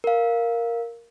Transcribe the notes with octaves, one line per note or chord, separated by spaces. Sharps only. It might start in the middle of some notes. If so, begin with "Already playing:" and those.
A#4 F5